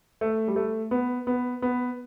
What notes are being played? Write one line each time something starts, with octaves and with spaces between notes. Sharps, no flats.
A3
G3
A3
B3
B3
B3